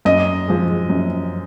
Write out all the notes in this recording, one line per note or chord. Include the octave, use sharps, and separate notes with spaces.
F#2 D#5
F3 G#3
F#2